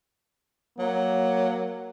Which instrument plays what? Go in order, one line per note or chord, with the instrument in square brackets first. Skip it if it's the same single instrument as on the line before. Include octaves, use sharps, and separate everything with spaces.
[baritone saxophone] F#3 [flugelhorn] A#3